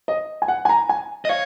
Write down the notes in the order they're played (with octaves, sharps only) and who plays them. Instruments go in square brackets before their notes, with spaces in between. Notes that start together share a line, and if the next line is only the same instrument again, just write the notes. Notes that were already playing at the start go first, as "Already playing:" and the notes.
[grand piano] D#5
G#5
F#5
G#5
A#5
G#5
[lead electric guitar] D#5
[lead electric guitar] C#5 [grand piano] F5